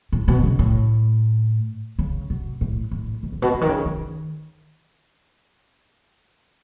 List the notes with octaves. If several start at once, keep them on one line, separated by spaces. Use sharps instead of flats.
A2
B2
C#3
A2
C#3
B2
A2
A2
B2
A2
B2
C#3
D#3
C#3
D#3